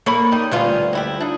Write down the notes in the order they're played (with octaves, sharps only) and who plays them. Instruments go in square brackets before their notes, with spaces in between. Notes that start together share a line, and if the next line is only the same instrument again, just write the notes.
[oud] A#3 C#5 [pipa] A4 B5
[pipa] G3 D#4
[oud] D2 G3 F4 [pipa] B2 F#3 C#4
[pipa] F#3 E4 G4
D4 D#4